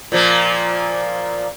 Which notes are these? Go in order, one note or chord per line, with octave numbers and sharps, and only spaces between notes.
A#2 F3 A#3